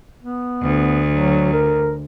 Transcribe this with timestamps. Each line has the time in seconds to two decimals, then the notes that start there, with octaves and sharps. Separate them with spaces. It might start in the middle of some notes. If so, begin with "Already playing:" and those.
0.23 B3
0.62 D2
1.12 F#3
1.53 A#4